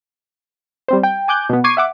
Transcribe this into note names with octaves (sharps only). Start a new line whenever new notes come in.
G3 C4 C5
G5
G#5 D6 F#6 G6
B2 B3
C#6 D6 G#6 C7 D#7
E5 F#5 D6